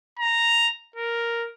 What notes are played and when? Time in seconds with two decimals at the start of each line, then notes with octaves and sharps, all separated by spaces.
0.19 A#5
0.96 A#4